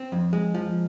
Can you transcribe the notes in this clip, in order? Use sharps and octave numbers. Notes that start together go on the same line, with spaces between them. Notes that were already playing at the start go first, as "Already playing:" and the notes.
Already playing: C4
F2
G#3
F3